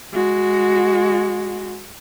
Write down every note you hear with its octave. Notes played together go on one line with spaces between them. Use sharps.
G#3 F#4